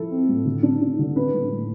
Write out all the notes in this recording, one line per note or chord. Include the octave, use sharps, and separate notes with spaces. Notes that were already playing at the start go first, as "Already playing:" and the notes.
Already playing: F3 E4 A4
C4
A2
D3
D4
D4
D3
D4 B4
A2
A2